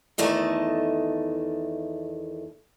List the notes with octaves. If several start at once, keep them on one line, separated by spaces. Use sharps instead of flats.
E2 D#3 A3 D#5 A5